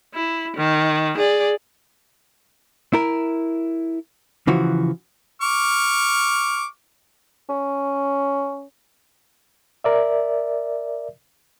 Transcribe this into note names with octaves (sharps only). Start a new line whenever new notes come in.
E4
D#3
G#4 D5
E4 A#4
C#3 E3 F3 F#4
C#6 D6 F6
C#4
A#4 D5 E5